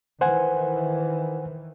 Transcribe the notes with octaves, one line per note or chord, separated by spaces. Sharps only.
D#3 E3 C5 F#5 G#5